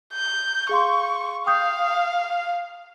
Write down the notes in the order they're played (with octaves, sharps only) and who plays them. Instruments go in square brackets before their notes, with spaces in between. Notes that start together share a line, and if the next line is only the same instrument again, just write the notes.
[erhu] G6
[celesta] G#4 F5 C6 [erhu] C#6
[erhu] F5 [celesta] G5 D#6 G6